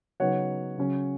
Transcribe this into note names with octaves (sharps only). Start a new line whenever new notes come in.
C#3 F#3 B3 D#4 C#5 F#5
C#3 F#3 C#4